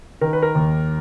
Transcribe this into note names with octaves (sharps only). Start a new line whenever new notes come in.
D#3 A#4
B4
A#4
D#2